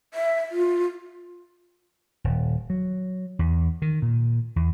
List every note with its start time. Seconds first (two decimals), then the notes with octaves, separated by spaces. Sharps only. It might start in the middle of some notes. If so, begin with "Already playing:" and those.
0.14 E5
0.51 F4
2.24 D#1
2.70 F#3
3.39 E2
3.82 D#3
4.02 A#2
4.56 E2